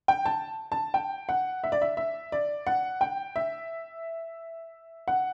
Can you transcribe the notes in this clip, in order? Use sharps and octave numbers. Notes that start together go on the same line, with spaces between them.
G5
A5
A5
G5
F#5
E5
D5
E5
E5
D5
F#5
G5
E5
F#5